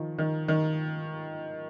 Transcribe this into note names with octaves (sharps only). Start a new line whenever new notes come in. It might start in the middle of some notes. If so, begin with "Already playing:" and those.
Already playing: D#3 F3
D#3
D#3